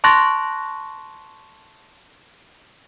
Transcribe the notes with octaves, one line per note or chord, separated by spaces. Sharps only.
A5 C6 C#6 F#6 A6 A#6